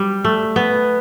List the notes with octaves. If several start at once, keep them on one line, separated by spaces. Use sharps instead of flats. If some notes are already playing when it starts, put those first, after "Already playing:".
Already playing: G3
A3
B3